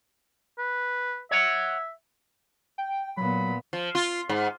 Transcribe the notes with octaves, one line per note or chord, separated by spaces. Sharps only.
B4
C#5 E5 F#5
G5
A#2 F#3 B3 B5
F3
F4
G#2